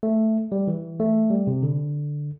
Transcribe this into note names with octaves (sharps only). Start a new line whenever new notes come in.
A3
G3
E3
A3
G3
C3
D3